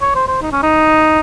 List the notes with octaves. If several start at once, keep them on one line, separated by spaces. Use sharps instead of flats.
C#5
C5
C5
D#4
C#4
D#4